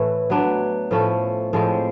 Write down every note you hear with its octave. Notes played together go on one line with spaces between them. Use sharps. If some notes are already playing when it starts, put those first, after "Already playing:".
Already playing: A2 E3 A3
F#3 B3 D4
A2 F3 A3 C#4
A2 F3 G#3 C4